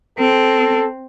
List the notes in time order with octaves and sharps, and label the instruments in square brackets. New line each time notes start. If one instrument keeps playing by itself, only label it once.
[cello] C4 [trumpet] A4